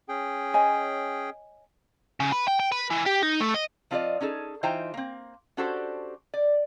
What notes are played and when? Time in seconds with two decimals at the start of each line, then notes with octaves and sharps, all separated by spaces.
0.09 C#4 G#4 G5
0.54 C#5 D#5 G#5
2.20 C#3
2.32 B4
2.48 G5
2.60 G5
2.72 B4
2.90 E3
3.06 G4
3.23 D#4
3.41 A3
3.54 D#5
3.91 F3 C4 F4 A#4 D5 D#5
4.21 C#4 D#4 G#4 A4
4.63 E3 D#4 F4 C5 G5 A#5
4.94 A#3 C4
5.57 C#4 D4 F#4 G4 A4 C5
6.34 D5